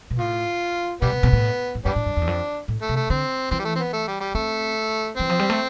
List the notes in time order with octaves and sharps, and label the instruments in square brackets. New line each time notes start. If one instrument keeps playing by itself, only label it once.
[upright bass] B2
[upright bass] A2 [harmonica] F4
[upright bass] B2 [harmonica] G3 B3
[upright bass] C3
B2
A2
A2
[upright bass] G2 [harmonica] G3 B3 D4
[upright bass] A2
G2
F2
E2
F2
A2
[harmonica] A3
[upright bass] C3
[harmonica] A3
[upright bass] D3 [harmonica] C4
[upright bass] E3 [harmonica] C4
[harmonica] G3
A3
C4
B3
A3
G3
G3
[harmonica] A3 [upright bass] C4
[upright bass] E3 [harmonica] C4
[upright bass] F3
G3
A3